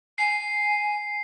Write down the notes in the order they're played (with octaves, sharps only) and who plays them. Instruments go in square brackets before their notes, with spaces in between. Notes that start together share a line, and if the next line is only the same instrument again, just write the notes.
[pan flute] G#5 [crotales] C7